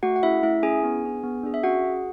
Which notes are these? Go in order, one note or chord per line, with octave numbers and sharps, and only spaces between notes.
A3 F#4 F#5
F#5
C#4 E4 G#4 E5
A3 E4 E5
C#4 E4 G#4 G#5
B3
D4 G#4
B3
D4 G#4
E5
C#4 F#4 F#5
G#4